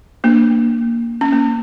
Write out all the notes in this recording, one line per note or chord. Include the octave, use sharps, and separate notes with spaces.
A#3 D4
C#4
A#3